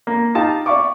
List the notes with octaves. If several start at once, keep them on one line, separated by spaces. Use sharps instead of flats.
A#3
D#4 F4 G4 F5 A5
D5 E5 F5 C#6 D6